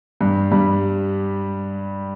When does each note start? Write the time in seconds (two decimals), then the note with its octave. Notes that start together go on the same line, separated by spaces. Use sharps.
0.20 G2 G3
0.52 G2 G3